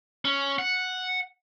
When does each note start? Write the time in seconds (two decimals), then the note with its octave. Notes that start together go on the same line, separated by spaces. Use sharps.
0.25 C#4
0.59 F#5